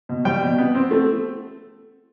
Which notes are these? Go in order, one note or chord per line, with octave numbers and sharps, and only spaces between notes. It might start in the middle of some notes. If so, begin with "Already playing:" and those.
B2
G3 G5
B2
B3
C4
A3